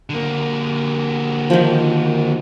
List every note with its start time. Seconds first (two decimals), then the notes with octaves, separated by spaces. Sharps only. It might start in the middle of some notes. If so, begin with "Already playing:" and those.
0.10 D3 A#3
1.50 D#3 F3